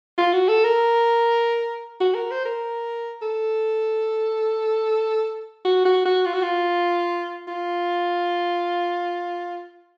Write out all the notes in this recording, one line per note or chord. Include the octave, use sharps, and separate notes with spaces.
F4
F#4
A4
A#4
F#4
A#4
C5
A#4
A4
F#4
F#4
F#4
F4
F#4
F4
F4